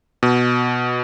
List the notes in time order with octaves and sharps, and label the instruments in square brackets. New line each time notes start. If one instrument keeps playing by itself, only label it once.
[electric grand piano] B2